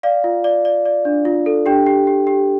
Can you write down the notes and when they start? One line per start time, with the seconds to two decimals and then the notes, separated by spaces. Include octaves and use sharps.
0.03 D5 F5
0.24 F4
0.44 D5
0.65 D5
0.85 D5
1.05 D4
1.25 F4
1.46 A4
1.66 D4 G4 G5
1.86 G4
2.07 G4
2.27 G4